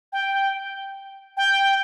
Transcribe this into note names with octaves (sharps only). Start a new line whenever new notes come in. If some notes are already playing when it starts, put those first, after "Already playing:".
G5
G5